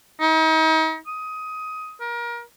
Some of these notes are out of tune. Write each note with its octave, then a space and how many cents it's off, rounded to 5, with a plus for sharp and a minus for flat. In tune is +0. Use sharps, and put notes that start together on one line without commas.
D#4 +40
D#6 +15
A#4 +30